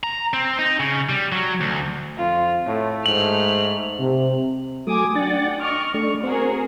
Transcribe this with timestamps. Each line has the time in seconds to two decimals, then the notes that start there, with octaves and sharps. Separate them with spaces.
0.03 A#5
0.33 C4
0.59 D#4
0.80 C#3
1.09 G3
1.32 F#3
1.61 D2
2.17 F2 F4
2.66 A2 A3
3.06 G#2 F6 F#7
4.00 C3
4.87 F#3 A3 G#5 D6 D#6
5.15 D4 F#5 G5 A6
5.60 D#5 C#6 D6 F6
5.94 A3 D4 C#6
6.24 C4 F#4 G#4 A#4